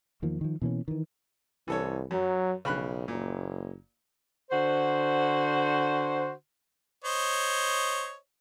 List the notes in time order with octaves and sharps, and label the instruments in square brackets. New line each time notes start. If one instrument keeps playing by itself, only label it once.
[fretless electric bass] E2 D#3 F3 A#3
D#3 F3
B2 E3 A#3 C#4
D#3 E3
[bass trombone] C2 [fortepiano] E3 A4 C#5
[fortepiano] F#2 [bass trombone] F#3
[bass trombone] B1 [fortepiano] C#3 B5 F#6
[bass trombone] F#1 [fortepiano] A#2
[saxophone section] D3 F#4 C5
[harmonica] C5 C#5 D#5